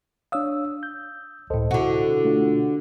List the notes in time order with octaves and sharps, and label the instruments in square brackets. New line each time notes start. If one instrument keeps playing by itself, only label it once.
[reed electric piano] D4 C#5 F5 [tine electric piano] D#6 E6
[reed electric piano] G6
[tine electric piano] C#2 A2 [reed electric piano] A4 C5 D#5
[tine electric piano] B2 E4 [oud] D3 F#4
[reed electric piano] A3 D4 F4